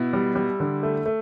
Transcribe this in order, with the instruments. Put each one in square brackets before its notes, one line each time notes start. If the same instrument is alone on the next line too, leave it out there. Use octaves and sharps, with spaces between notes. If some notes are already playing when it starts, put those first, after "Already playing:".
Already playing: [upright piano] B2 E4
G3
G3
D3
A3
A3